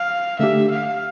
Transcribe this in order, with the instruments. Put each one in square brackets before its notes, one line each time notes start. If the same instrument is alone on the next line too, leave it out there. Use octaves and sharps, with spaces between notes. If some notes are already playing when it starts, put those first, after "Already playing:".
Already playing: [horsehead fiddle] F5
[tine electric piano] D3 A3 D4 G4 [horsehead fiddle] E5
[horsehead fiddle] F5